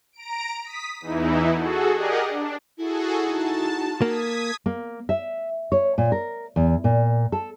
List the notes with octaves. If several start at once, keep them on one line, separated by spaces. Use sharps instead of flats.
A#5 D7
D#6 B6
E2 E3 D#4 E4
F#4 G#4 A4
G4 G#4 A#4 D5 D#5 F#5
D4
E4 F#4 G#4 A4
D#4 F#4 A5
A#3 D#6 G#6 B6
A#3
E5
C#5
A#2
A#4
E2
A#2
A4